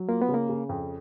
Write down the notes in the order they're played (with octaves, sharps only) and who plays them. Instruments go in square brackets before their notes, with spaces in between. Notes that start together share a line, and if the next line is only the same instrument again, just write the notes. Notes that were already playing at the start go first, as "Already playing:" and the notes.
Already playing: [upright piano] F#3
[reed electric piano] A#3 [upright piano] F4
[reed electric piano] B3
[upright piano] C#3
[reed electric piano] A#3
[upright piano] C#3
F2